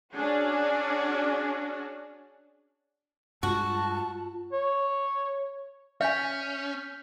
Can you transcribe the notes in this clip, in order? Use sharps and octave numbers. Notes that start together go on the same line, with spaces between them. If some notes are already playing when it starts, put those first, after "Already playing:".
C#4 D4 F#4 G#4
G2 G#3 F4 F#4 A5
C#5
C#4 E5 G#5 F6 G6 B6